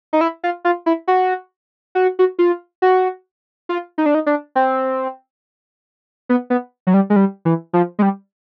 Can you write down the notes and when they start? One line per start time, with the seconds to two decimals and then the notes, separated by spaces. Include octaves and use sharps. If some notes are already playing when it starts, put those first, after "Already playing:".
0.13 D#4
0.21 E4
0.44 F4
0.65 F4
0.86 E4
1.08 F#4
1.95 F#4
2.19 F#4
2.39 F4
2.82 F#4
3.69 F4
3.98 D#4
4.06 D4
4.15 D#4
4.26 D4
4.55 C4
6.29 B3
6.50 B3
6.87 F#3
6.94 G3
7.10 G#3
7.16 G3
7.45 E3
7.73 F3
7.99 G#3
8.02 G3